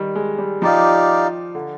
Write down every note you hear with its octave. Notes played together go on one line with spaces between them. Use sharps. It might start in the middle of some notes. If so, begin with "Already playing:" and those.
Already playing: D#3 G3
G#3
G3
F3 D#4 G4 D5 F5
D3